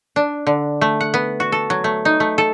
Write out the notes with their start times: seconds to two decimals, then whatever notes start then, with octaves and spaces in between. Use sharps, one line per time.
0.16 D4
0.47 D3
0.81 A3
1.01 F#5
1.14 B3
1.40 F#4
1.52 A4
1.70 F#3
1.84 A3
2.05 D#4
2.20 A3
2.38 A4